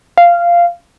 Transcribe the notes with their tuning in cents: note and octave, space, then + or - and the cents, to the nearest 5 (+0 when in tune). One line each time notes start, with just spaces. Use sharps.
F5 -10